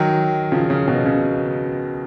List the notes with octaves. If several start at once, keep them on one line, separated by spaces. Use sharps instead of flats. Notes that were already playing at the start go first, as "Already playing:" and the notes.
Already playing: D#3 F#3
C#3 F3
C#3
B2
C#3